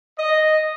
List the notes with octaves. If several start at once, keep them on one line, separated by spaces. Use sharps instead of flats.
D#5